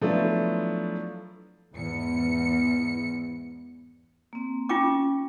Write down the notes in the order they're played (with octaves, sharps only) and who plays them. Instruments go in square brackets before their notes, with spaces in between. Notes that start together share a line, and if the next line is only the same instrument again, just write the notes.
[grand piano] F3 F#3 A3 B3 D4 E4
[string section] E2 G#2 C#7
[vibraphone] A#3 C4
[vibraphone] C#4 [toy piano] F4 G5 D6